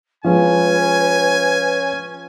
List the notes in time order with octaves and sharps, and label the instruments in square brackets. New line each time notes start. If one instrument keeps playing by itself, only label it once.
[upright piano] F3 G#3 [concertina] C#4 [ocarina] B4 [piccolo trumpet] G#5